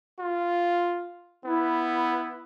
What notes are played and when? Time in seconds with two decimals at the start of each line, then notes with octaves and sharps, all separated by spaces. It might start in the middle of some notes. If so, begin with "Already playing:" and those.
0.20 F4
1.45 B3 E4